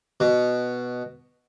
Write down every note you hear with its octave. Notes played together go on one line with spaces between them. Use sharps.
B2